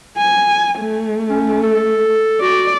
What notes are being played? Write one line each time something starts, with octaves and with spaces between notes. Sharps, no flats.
G#5
A3
C#4
A4
F#4 D5